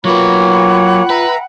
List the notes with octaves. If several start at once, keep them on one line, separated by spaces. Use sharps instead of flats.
F#3 A#3 F4 B4 C#5 F#5 G5 B5
B4 E5 A#5